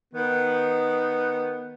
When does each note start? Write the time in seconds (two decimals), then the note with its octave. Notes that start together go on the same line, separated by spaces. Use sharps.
0.13 D#3 B3